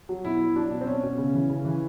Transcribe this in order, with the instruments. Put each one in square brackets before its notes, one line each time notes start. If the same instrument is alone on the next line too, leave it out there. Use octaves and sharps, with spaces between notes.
[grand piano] F#3
B2 E4
F#3
F#3 D4
B2
C4
B2 C#4
B2
C#3
E3
C#3
E3